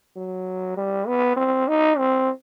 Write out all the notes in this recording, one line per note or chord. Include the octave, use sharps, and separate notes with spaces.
F#3
G3
B3
C4
D#4
C4